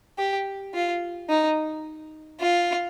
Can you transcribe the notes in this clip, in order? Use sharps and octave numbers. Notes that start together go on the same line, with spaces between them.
G4
F4
D#4
F4